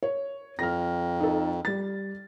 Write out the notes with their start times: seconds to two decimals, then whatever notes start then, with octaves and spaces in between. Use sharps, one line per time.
0.03 C#5
0.59 F2 F6 A#6
1.20 D#4 A4
1.65 G3 A6